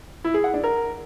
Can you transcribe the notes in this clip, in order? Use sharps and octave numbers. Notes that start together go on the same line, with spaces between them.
E4
G#4
F#5
D4
A#4